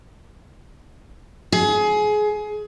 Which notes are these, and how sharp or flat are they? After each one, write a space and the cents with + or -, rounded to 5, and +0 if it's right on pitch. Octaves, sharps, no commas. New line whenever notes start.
G#4 +25